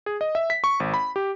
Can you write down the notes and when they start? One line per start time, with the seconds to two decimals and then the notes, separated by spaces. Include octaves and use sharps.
0.06 G#4
0.21 D#5
0.35 E5
0.50 B6
0.64 C#6
0.80 G#1
0.94 B5
1.16 G4